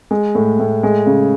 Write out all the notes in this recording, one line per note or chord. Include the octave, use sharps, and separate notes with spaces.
G#3
A2
A2
G#3
C#3